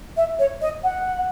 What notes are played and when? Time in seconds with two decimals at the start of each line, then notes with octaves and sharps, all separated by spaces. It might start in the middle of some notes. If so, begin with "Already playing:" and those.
0.17 E5
0.39 C#5
0.61 D#5
0.83 F#5